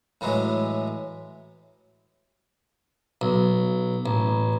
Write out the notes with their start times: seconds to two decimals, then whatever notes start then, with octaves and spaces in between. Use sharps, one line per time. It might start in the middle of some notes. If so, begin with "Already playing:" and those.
0.21 A2 E3 F#3 G#3
3.21 B1
4.06 A1